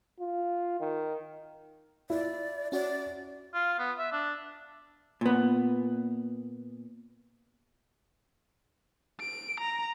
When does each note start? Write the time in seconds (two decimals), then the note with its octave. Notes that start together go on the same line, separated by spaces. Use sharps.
0.20 F4
0.80 D#3
2.10 E4 F4 D5
2.72 C#4 F#4 D5
3.54 F4
3.79 B3
3.98 E5
4.12 D4
5.21 A#2 B3
9.20 D7
9.60 A#5